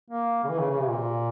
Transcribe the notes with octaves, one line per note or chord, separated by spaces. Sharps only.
A#3
C#3
E3
C#3
C#3
C3
A#2